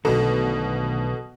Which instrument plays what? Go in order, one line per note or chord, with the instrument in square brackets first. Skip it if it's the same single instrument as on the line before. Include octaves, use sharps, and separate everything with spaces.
[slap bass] B1 D3 [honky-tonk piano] B2 [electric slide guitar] D#3 A3 B3 [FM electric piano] A4